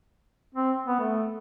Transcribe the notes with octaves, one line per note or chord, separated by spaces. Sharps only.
C4
B3
A3